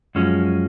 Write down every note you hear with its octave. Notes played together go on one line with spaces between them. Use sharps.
F#2 F3 G#3 C#4